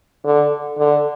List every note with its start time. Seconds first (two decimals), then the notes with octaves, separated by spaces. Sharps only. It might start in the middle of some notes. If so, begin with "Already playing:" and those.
0.25 D3
0.78 D3